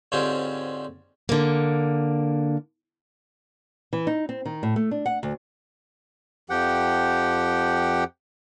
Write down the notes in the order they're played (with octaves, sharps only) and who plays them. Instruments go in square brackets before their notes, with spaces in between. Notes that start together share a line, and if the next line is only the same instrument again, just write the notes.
[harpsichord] G#2 D3 C4 C#4 F4 G4
[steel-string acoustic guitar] D3 A#3
[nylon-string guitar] E3
D#4
C4
D#3
A2
A3
D4
F#5
D2
[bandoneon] F2 F3 G4 F#5 G5